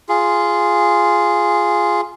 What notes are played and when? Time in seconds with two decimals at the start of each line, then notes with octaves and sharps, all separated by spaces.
0.09 F4 G#4